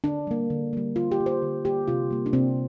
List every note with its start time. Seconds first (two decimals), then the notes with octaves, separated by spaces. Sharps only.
0.04 D3 D4
0.27 G3 A#3
0.50 D3
0.73 G3 A#3
0.96 D3 F4
1.11 G4
1.19 G3 A#3
1.26 C5
1.42 D3
1.64 G3 A#3 G4
1.88 C3 F4
2.10 G3 A#3
2.26 D4
2.33 C3 C4